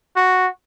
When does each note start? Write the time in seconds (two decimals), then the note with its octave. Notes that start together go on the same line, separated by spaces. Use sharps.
0.16 F#4